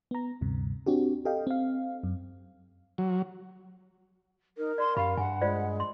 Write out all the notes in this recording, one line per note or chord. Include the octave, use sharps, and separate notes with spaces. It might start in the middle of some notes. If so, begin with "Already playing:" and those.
B3 A#5
D2 G2 C3
C4 D4 F#4 G4
G4 A4 D#5 F5 G5
C4 F5
F#2
F#3
D#4 A#4
D5 C6
F#2 G4 F5 B5
G2 F#5 G#5
G#3 F4 C5 D5
C6